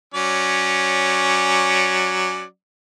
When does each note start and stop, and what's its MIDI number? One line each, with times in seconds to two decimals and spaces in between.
0.14 2.44 54
0.14 2.44 61
0.14 2.44 74